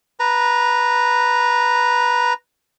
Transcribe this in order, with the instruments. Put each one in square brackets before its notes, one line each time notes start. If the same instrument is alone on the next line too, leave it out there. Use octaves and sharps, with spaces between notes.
[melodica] B4 A#5